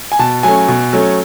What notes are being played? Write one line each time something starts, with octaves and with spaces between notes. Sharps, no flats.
G#5
B2 A5
F#3 A3 C#4 G#5
B2
F#3 A3 C#4